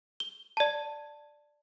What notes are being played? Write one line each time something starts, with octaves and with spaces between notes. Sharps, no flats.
G7
D5 A5